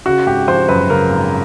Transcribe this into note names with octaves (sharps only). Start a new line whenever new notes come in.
C#3 F#4
G#1 G4
F3 C5
F#2 B4
C#3 A#4
G#1